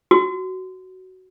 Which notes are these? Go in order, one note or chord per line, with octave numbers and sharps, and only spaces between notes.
F#4